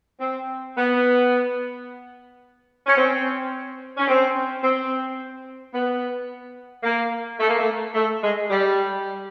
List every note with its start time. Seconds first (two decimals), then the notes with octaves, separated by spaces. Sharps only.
0.20 C4
0.76 B3
2.87 C#4
2.96 C4
3.97 C#4
4.08 C4
4.62 C4
5.73 B3
6.83 A#3
7.39 A3
7.48 A#3
7.58 A3
7.95 A3
8.22 G#3
8.49 G3